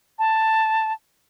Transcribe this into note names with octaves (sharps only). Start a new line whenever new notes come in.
A5